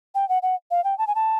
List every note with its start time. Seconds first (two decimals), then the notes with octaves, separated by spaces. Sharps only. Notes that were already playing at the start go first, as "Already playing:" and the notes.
0.15 G5
0.29 F#5
0.43 F#5
0.71 F5
0.84 G5
0.98 A5
1.07 G#5
1.15 A5